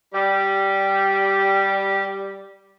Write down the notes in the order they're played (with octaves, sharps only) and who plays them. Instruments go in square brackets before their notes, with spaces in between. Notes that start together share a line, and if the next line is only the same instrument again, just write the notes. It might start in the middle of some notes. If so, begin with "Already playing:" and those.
[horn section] G3 [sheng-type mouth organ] G4